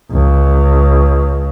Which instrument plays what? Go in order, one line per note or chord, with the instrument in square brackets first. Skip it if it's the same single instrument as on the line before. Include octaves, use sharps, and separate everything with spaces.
[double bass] C#2